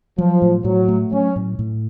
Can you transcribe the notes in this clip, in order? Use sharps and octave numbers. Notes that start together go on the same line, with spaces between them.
F3 F#3
A2
A2 F#3
A3
F#3 C#4
A2
A2